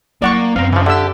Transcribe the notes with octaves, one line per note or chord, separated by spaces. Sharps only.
F#3 A#3 E4 D5 F#5 C#6
F#2 B3 C4 F5 A#5
C#3 E3 F3
D3 G4 E5 E6